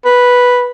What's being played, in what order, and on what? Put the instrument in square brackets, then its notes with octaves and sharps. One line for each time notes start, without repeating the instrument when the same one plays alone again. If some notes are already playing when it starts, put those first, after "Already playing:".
[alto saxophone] B4